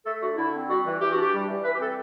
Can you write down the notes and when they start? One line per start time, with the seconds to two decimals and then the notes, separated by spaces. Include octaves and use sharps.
0.05 A3 A4
0.21 D3 F#4
0.36 D3 E4
0.53 C4
0.68 G3 F#4
0.84 E3
1.00 E3 G4
1.11 D4 F#4
1.21 G4
1.32 G3
1.48 E3
1.63 E3 B4
1.74 G4
1.80 C4 A4